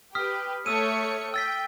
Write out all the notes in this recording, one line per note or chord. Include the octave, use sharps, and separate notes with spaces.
G4 B4 D#6 F6 B6
A3 C#5 D#6 E6 C#7 D#7
G5 E6 A6 B6